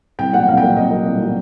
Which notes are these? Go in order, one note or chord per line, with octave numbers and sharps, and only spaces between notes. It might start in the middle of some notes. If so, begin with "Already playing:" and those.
C2 G5
A#2 F#3 F#5
C2 F5
G5
A#2 F#3
C2 D#5
A#2 F#3
C2
A#2 F#3